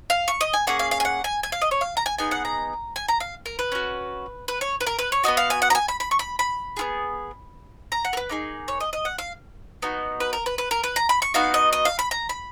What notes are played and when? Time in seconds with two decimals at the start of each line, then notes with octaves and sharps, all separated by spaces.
0.10 F5
0.28 C#6
0.41 D#5
0.53 G#5
0.67 A#3 C#4 G#4 F#5
0.79 F5
0.91 F5
1.00 G#5
1.05 F#5
1.24 G#5
1.43 G#5
1.52 F5
1.61 D#5
1.71 C#5
1.81 F5
1.97 A#5
2.06 G#5
2.18 B3 D#4 G#4 G#5
2.31 F#5
2.45 A#5
2.96 G#5
3.08 A#5
3.20 F5
3.46 A#4
3.59 B4
3.72 C#4 F#4
4.48 B4
4.61 C#5
4.81 B4
4.87 A#4
4.99 B4
5.12 C#5
5.24 B3 D#4 F#4 D#5
5.37 F5
5.50 G#5
5.62 F#5
5.70 A#5
5.75 G#5
5.88 B5
6.00 B5
6.11 C#6
6.19 B5
6.39 B5
6.77 B3 F4 G#4
7.92 A#5
8.05 F#5
8.13 A#4
8.17 B4
8.30 A#3 D#4 G#4
8.68 C#5
8.80 D#5
8.93 D#5
9.05 F#5
9.18 F5
9.82 B3 D#4 F#4
10.20 B4
10.33 A#4
10.46 B4
10.58 B4
10.71 A#4
10.84 B4
10.96 A#5
11.09 B5
11.22 C#6
11.34 B3 D#4 F#4 F5
11.54 D#5
11.73 D#5
11.85 F5
11.99 B5
12.11 A#5
12.29 B5